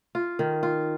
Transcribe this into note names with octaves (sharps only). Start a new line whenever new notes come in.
F4
D#3
F4